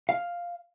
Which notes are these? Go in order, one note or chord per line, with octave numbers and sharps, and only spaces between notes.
F5